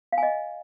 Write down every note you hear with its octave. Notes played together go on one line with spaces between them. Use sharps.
F5
G#5
D#5